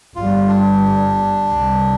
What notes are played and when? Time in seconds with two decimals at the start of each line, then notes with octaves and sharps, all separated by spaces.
0.15 G1 G2 G3 F4
0.49 D4
1.50 C2 C3 G3